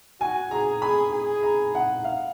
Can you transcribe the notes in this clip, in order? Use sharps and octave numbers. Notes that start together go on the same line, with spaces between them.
F#4 G#5
G#4 A#5
G#4 B5
G#4
A#5
F#5
F5